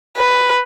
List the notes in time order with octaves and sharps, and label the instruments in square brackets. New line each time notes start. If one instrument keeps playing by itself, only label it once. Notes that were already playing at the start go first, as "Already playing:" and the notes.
[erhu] B4